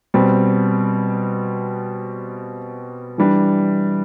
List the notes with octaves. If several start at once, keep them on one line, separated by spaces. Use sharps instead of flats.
B2 G3 C4
E3 G3 D4